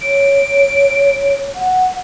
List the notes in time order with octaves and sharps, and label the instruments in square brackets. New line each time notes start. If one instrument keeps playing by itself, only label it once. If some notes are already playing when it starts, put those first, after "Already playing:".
[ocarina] C#5 [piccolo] D7
[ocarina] F#5